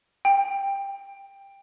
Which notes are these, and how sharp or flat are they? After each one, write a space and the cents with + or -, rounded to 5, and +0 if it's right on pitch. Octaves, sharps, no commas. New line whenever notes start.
G5 +15